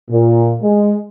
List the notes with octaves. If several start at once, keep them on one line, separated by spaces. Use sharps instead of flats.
A#2
G#3